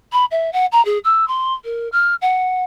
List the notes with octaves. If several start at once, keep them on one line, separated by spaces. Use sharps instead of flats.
B5
E5
F#5
A#5
G#4
E6
C6
A#4
F6
F#5